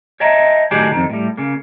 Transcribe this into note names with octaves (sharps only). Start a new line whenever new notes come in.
C#5 D#5 E5 G5 A5 A#5
A2 D#3 F#3 D4 G4 G#4
F2 D#3
A2 G3
C#3 A#3